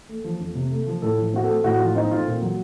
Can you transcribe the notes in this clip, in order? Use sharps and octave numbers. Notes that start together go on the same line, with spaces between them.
A3
F3
F2
C3
A3
F3
A2 A4
F3
C4 F#4
A4
A3
A2 F#4
F3 F4
C4 D#4
A3 F4
A#2
F#3